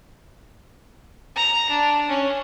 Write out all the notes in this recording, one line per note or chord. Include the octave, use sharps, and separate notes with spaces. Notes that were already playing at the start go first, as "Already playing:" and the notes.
A#5
D4
C#4